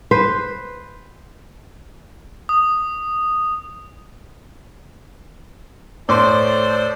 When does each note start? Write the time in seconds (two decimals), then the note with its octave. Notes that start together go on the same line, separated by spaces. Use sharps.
0.11 B4 C5
2.49 D#6
6.09 A2 A4 C5 D5 C6 D6